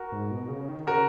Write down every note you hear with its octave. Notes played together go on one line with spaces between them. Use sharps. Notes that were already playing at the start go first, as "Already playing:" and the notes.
Already playing: F#4 A#4
G#2
B2
C#3
D#3
C#3 F#4 A#4